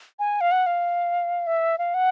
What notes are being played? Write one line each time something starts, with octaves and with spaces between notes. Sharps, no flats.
G#5
F5
F#5
F5
E5
F5
F#5